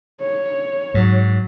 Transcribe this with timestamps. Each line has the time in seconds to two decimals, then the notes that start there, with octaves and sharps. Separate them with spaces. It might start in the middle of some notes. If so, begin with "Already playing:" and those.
0.21 C#5
0.94 G#2 F#3